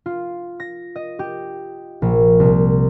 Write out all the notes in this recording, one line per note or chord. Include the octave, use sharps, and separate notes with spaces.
F4
A#6
D#5
G4
A#1
C2